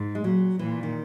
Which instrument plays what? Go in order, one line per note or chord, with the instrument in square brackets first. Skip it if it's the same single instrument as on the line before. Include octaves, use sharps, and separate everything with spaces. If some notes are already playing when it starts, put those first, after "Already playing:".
Already playing: [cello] G#2
[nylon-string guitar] G#3
[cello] A#2 [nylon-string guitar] F#3
[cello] A#2 [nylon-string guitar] E3
[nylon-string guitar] D#3